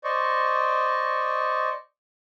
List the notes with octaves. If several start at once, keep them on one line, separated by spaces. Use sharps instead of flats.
C5 D5 D#5 C#6